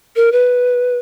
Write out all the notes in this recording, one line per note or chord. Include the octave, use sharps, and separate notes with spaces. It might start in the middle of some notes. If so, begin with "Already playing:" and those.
A#4
B4